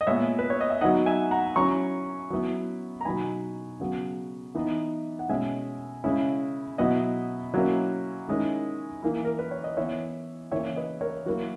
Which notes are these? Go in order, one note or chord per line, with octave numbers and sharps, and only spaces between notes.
D#5
A#2 G#3 B3 C#5 E5
B4
C#5
D#5
E5
F#3 B3 D#4 D#5 F#5
E5 G#5
F#5 A#5
F#3 C#4 E4 A#5 C#6
F#3 B3 E4
A#5
B2 F#3 B3 D#4 G#5 B5
C#3 F#3 B3
E3 B3 D#4
F#5
B2 G#3 C#4 E5 G#5
C#3 G#3 C#4 E4
B2 F#3 B3 E4 D#5 F#5
F#3 A#3 C#4 E4
D#3 G#3 C#4 E4
E3 A#3 E4
A#4
B4
C#5
D#5
E3 B3 E4 C#5 E5
C#3 E3 A#3 E4 C#5 E5
B4 D#5
A#4 C#5
F#3 A#3 E4 F#4 A#4